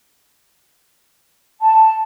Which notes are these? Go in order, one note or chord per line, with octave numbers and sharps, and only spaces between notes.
A5